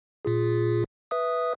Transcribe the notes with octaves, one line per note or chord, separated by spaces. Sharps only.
A#2 F4 G#4
B4 E5 D#6